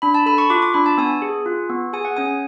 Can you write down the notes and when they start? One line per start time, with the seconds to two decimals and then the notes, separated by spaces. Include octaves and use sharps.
0.02 D4 B5
0.14 A5
0.26 A4 B5
0.38 C#6
0.50 F4 D6
0.62 D6
0.74 D4 B5
0.86 A5
0.98 B3 G#5
1.22 G#4
1.46 F4
1.70 B3
1.93 G#4 G#5
2.05 F#5
2.17 C#4 G#5